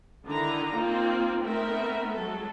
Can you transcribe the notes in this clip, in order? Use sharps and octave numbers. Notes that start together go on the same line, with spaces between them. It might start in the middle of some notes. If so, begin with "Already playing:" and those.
D3 D#3 D#4 E4 A#5
A#3 C4 D#4 F4
A3 B3 C4 D#4 A#4 E5
F#3 G#3 A4